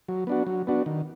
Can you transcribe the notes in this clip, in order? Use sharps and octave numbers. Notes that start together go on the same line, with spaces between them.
F#3
B3 D4 F#4
F#3
B3 D4 F#4
D#3